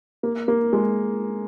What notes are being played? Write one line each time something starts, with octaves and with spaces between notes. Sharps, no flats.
A#3
A#3
G#3